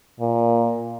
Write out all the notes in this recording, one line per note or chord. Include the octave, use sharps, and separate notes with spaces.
A#2